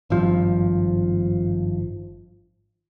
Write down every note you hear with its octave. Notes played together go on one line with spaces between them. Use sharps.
G#1 G2 F3